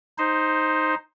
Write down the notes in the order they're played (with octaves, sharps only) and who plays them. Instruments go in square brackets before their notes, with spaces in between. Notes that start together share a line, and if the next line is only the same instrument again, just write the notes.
[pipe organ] D#4 C5